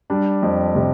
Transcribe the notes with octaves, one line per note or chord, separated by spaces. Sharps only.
G3 D4
F2
C3